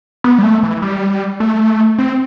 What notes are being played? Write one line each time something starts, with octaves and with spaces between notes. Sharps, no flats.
B3
G3
A3
E3
G3
A3
C4